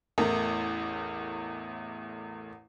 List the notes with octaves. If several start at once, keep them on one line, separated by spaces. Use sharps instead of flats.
A1 E2 A3 A#4